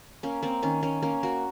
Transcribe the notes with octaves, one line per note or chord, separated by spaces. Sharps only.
A#3 C#4
A#3 C4
D#3 C#4
A#3 C#4
A#3 C#4
A#3 F#4